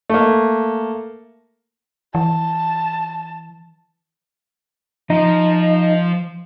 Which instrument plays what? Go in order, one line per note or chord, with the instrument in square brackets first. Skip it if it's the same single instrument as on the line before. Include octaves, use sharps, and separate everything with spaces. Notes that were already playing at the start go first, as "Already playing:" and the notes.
[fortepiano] A3 A#3
[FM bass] E3 [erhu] A5
[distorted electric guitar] F3 [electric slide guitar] D#4